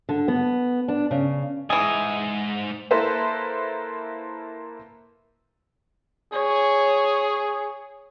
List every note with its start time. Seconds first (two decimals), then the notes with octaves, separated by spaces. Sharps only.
0.09 D3
0.28 B3
0.88 D4
1.11 C#3
1.70 G#2 E3 G#4 D#5
2.91 A#3 E4 A4 B4 C5
6.33 G#4 C#5